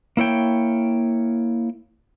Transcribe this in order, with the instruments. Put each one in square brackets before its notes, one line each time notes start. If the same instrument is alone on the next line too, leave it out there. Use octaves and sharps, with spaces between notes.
[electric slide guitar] A#3 E4 C#5 G5